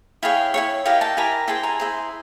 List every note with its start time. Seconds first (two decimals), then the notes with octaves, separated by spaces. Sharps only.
0.23 E4 G#4 C#5 F5 G5
0.54 E4 G#4 C#5
0.85 E4 G4 A#4 D#5 F5 G5
1.01 G5 A5
1.17 E4 G4 A#4 G#5 A#5
1.48 E4 G#4 C5 G5 A5
1.63 G#5 A#5
1.80 E4 G#4 C5